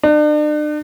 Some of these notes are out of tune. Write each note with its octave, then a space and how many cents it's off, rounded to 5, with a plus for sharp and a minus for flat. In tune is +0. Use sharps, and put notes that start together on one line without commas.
D4 +40